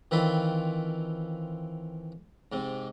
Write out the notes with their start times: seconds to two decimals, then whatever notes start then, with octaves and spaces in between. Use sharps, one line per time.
0.11 D#3 E3 C4 F4 A4 B5
2.52 G#2 C3